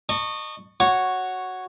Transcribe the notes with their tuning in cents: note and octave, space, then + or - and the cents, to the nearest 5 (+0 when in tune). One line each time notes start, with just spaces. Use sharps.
D#5 -30 A5 +35 C#6 +0
F#4 +0 C#5 -5 C#6 +0